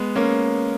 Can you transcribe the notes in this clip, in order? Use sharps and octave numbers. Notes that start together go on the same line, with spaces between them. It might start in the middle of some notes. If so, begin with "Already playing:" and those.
Already playing: G#3 B3
A#3 C#4